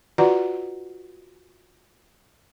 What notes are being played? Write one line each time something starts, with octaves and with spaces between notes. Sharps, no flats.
F4 F#4 B4 D5 F#5 A#5